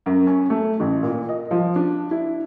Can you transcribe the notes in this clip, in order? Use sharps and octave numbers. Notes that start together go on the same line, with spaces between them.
F#2
C#4
A3
A1
A#2
D#5
F3
D4
E4